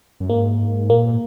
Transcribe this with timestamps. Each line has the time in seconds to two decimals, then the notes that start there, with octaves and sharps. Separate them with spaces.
0.20 F#2
0.29 G#2 A#3
0.90 A#2 A#3